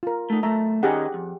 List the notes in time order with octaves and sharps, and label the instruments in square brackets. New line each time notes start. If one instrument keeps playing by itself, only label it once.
[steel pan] F4 A#4
[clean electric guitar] A3 D#4
[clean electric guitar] B1 A3 E5 [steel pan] A#5
[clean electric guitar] D#3 C#4 D#4 [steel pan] G4 G#4 F#5
[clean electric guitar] F2